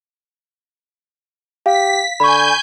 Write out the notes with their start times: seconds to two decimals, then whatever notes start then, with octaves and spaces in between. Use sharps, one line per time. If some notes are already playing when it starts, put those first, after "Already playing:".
1.66 G4 F5 B6
2.20 D3 G#5 B5 C#6 G6